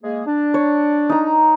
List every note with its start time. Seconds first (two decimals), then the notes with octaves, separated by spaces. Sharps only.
0.03 G#3 A#3 G#4
0.26 D4
0.54 C#5
1.09 D#4 A#5